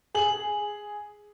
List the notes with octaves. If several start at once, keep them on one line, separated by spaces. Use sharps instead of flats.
G#4 G#5 F#7